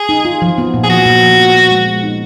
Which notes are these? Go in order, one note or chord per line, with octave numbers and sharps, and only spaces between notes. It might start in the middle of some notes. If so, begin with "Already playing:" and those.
Already playing: G#4
D#4
F4
F3
B3
A#2
G#4
F3 F#4
A#2
F3
B3
B3
G#3
B3
D#4